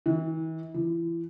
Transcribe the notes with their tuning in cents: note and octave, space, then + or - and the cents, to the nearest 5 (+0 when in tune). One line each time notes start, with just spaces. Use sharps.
E3 -40
E3 +30